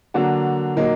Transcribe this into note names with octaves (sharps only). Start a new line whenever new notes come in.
D3 F#3 A#3 D4 F#4
A#2 F#3 A#3 D#4